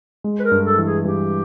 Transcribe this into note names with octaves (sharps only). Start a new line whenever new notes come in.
G#3
B4
A#4
G2
A4
E3
G#4
G2 G4